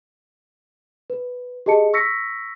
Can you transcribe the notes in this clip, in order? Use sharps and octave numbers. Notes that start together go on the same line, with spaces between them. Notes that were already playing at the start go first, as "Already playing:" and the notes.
B4
G4 G#4 D#5 A5 C#7
C#6 E6 A#6 B6 C#7